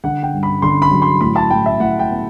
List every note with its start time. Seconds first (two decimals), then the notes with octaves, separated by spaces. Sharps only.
0.04 D3 F#5
0.23 G5
0.33 G2
0.43 B5
0.62 D3 C6
0.82 B5
0.91 F#3
1.02 C6
1.21 A2 B5
1.36 A5
1.50 A2 G5
1.66 E5
1.80 A2 F#5
1.99 G5
2.10 B3